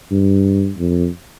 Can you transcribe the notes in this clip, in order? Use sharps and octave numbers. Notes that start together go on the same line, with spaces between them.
G2
F2